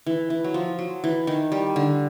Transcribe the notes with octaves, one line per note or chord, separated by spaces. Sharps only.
E3
E3
F#3
F3
F#3
E3
D#3
G3
D3